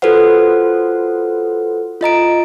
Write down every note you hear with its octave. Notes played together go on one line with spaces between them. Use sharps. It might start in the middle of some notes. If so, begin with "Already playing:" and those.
F4 F#4 A4 B4 C5 F#5
F4 D#5 A#5 D7